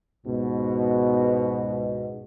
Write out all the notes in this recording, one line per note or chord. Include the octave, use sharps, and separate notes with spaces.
C#2 G#2 B2